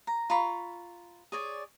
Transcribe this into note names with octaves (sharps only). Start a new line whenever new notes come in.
A#5
F4 A#5 B5 C#6
G#4 C#5 D5